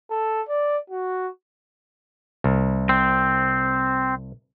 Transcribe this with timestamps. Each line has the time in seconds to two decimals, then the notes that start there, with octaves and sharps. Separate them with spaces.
0.11 A4
0.48 D5
0.90 F#4
2.44 C2
2.89 C4